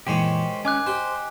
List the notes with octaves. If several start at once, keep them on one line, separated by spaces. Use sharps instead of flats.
F#2 A#2 D#3 E3 G#3 G4 C5 C#5
C#4 D#5 G#5 D6 F#6
G4 C5